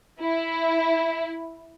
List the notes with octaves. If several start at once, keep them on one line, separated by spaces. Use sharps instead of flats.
E4